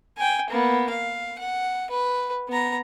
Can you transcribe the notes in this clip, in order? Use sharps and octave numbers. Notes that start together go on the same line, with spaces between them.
G5 G#5
A#3 B3
F5
F#5
B4
B3 A#5